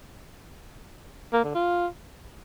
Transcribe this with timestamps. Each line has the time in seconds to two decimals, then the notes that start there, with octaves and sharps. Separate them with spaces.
1.33 A#3
1.44 D3
1.55 F4